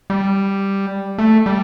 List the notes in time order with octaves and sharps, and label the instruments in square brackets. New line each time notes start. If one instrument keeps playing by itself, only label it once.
[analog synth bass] G3
A3
G3